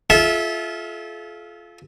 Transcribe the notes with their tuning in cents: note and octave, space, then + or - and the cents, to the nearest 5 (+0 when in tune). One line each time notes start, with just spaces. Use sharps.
F4 -10 A4 -45 E5 -15